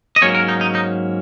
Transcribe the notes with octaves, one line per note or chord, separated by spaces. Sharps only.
D#5
G#2 F#3 A#3 C#4 C#5
A#4
D#4
D#4
D#4